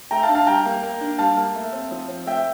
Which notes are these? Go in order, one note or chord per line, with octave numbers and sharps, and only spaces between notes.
A3 G5 A#5
F5 A5
D4
F5 A5
G3 G5 A#5
A#3
A#3
D4
G3 F5 A5
A#3
A3
C4
F3
C4
A3 E5 G5